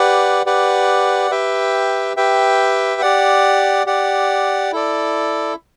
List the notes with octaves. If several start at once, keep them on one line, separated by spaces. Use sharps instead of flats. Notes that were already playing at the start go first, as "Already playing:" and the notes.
Already playing: G4 B4 D5 F#5
G4 B4 D5 F#5
G4 B4 E5 G5
G4 B4 E5 G5
G4 D5 F#5
G4 D5 F#5
E4 A4 D5